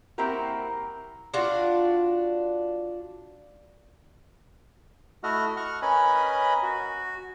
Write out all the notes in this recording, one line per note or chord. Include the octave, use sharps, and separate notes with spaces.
A#3 C4 E4 F#4 G4 A#4
D4 F4 F#4 F5
A3 E4 F#4 D#5 F#5 F6
F#5 C#6 F6
C#4 A#4 B4 D#5 G#5 B5
F#4